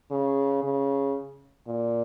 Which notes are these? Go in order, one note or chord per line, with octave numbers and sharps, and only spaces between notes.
C#3
C#3
A#2